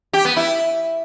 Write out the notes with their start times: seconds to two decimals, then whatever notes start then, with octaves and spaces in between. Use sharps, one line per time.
0.13 G4
0.25 B3
0.37 E4